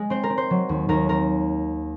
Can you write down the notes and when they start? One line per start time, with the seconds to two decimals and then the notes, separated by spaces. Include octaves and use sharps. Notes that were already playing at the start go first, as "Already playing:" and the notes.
Already playing: G#3 D#5
0.10 C4 C5
0.23 A#4
0.30 C4
0.38 C5
0.50 F#3
0.69 D#2
0.89 D#2 A#4
1.09 C4 A#4